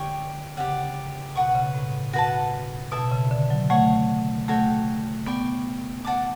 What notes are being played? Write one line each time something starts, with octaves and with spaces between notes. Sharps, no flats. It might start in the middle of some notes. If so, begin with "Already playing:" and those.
Already playing: D3 G4 C#5 G5 C#6
C#3 G4 D5 F#5
B2 B4 F#5 C#6
C#3
A2
F#4 B4 F#5 A5
B2 E4 A4 E5 A5
C#3
D3
F#3
A3 C#5 F#5 C#6
A3 F#4 A4 C#5 G5
B3 D5 G5 C#6
D5 F#5 A5 D6